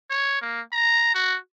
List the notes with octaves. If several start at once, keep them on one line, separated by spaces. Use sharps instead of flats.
C#5
A#3
A#5
F#4